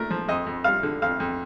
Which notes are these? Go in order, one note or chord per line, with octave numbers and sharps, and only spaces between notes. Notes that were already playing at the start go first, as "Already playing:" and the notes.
Already playing: A#2 A3 A#4
F3
F2 D#5
F2
G3 F5
D3
F2 F5
F2